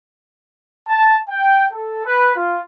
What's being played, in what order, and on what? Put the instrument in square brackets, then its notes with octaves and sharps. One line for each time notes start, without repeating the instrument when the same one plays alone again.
[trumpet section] A5
G5
A4
B4
F4